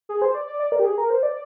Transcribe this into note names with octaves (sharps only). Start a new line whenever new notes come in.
G#4
C5
D5
D5
D5
A#4
G4
G#4
A#4
C5
D5